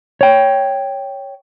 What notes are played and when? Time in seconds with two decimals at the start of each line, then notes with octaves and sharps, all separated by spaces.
0.21 C#5 G5